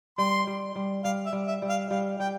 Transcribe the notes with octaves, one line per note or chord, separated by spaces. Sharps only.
G3 C6
G3
G3
G3 F5
E5
G3
E5
G3
F5
G3 F5
G3 G5